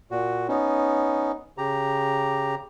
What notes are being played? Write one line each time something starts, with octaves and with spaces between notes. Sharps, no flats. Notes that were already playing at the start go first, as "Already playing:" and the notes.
A#2 F#4
B3 C#4 D#4
C#3 G4 A#5